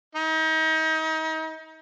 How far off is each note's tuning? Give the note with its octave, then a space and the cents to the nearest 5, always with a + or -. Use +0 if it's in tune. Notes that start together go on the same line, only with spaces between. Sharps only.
D#4 +35